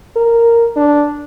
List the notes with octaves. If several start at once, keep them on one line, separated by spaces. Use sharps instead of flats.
A#4
D4